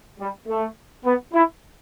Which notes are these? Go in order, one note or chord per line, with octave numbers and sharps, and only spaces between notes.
G3
A3
B3
E4